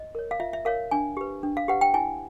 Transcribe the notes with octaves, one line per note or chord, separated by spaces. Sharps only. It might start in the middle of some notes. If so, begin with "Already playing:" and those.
Already playing: D#5
A#4 C#5
F5
F4 E5
E5
A#4 C#5 F5
D4 G#5
G4 B4
D4
F5
G4 B4 F#5
G5
E4 G#5